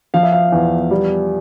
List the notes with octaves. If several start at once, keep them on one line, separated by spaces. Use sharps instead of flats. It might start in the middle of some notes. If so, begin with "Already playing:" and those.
F3 F5
E5
F5
E2
G3